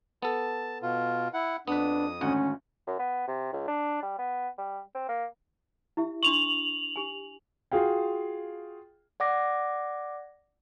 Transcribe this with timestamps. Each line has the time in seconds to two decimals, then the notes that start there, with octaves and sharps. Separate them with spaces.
0.22 B3 A4 A5
0.82 B2 F4
1.34 E4 F#5
1.68 F2 B3 D4 B4 D#6
2.21 G#1 D2 C#4 F#5
2.87 F#2
2.99 B3
3.28 C3
3.53 C#2
3.68 D4
4.03 G3
4.19 B3
4.58 G3
4.95 C4
5.09 A#3
5.97 E4 G4 E5
6.23 D4 C6 C#6 F7 F#7
6.96 G4 G#5
7.72 F4 F#4 G#4 F5 G5
9.20 D5 F#5 D6 A#6